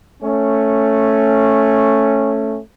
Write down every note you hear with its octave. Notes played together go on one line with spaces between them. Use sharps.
A3 C#4